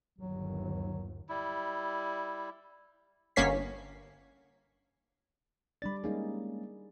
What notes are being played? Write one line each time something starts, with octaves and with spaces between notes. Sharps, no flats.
G1 D#2 F#3
G3 E4
G1 A#3 C#4 C#5 B6 C7
G3 D4 D5 B5 A6
G3 G#3 A#3 C#4 D#4 G#4